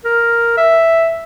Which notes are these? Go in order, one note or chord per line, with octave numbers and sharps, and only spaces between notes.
A#4
E5